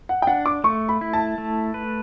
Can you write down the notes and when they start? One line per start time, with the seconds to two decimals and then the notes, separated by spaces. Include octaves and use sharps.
0.09 F#5
0.22 G5
0.27 D4 F#5
0.46 D6
0.64 A3 C#6
0.89 B5
1.01 E4
1.13 A5
1.38 A3
1.74 B4